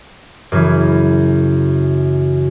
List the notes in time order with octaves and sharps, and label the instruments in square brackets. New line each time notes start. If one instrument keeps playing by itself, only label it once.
[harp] F#2 C#3 E3